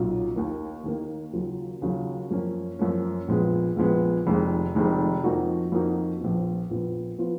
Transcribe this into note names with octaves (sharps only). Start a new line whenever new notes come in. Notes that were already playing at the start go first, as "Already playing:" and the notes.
Already playing: B1 A#2 F#3 C#4 F4
D#2 D#3 A#3
D#2 D#3 A#3
D#2 C#3 F#3 C#4 F4
D#2 C#3 F#3 C#4 F4
F#2 F3 A#3 C#4
F#2 F3 A#3 C#4
A#1 A#2 G#3 B3
A#1 A#2 G#3 B3
F1 F2 D#3 G#3
F1 F2 D#3 G#3
F2 F3 A#3 D#4 F#4
F2 F3 A#3 D#4 F#4
A#1 A#2 F3 B3
A#1 A#2 F3 B3
F3 B3 F4